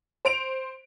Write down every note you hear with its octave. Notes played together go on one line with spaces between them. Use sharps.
C5 D7 F7